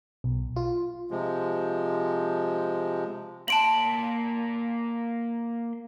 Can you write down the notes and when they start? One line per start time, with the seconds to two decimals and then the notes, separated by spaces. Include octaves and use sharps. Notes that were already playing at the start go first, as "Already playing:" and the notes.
0.24 B1
0.56 F4
1.11 C3 F3 G#3
3.48 A#3 A5 C6 D7 F#7